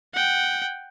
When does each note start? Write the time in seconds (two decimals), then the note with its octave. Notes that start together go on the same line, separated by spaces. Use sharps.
0.14 F#5 G5